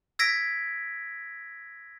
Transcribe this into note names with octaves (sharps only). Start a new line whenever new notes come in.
E6 G#6 A#6 B6 D7